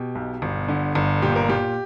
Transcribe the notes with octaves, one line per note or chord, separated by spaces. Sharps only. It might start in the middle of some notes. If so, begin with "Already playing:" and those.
Already playing: B2 G4
B1
G1
D3
G1
A#2 G4
A#4
A#2 G4